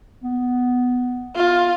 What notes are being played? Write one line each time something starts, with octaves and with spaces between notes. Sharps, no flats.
B3
F4